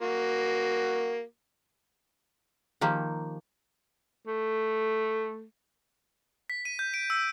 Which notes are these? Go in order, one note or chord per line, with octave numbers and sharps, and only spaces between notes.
A#3 F#4
D#3 F3 A#3 G4
A3
B6
D#7
G6
D7
E6